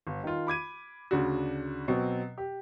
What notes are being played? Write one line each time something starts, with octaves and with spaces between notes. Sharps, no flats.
G1
D#3 F4
B5 D6 G#6 D#7
D2 C#3 D4 F#4
B2 F#3 C4
G4